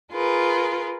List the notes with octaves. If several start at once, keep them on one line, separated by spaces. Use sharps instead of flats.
F4 G#4 A#4 B4